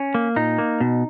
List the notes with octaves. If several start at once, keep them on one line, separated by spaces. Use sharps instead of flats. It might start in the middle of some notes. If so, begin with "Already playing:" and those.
Already playing: C#4
A#3
A#2 D#4
A#3
B2